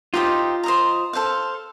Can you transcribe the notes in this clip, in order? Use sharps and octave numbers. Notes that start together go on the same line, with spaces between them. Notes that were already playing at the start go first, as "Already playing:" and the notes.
D#4 F4 G4 C5 D#5
C5 D#5 A#5
A4 C5 F5